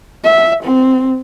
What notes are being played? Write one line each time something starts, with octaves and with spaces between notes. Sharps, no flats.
E5
C4